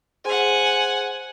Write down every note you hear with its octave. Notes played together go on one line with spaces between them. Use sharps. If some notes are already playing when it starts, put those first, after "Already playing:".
G#4 C5 F#5 G#5 C6